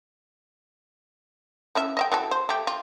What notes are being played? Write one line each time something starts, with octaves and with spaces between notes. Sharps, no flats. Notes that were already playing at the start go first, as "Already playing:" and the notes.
E3 C#4 E5
D#5 E5 G5
E3 F#3 A4
C5
A3 G4
F4